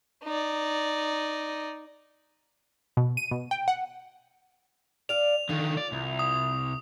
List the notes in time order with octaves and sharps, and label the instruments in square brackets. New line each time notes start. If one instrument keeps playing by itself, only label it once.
[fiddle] D#4 D5
[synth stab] B2
D#7
B2
G5
F#5
[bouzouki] D5 F5 [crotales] F7
[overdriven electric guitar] D3 D#3 [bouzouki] F4
[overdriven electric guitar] D5
C2
[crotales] D#6